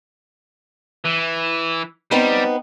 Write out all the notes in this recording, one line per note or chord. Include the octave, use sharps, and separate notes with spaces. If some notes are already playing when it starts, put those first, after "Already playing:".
E3
G3 B3 C4 D#4